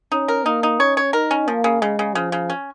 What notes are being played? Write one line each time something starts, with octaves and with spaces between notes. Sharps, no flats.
C#4 D#4
A#4
A#3 D#4
D#4
C#4 C#5
C#5
D#4 A#4
C#4
F3 A#3
C#3
C#3 G#3
C#3
C#3 F3
C#3
C#4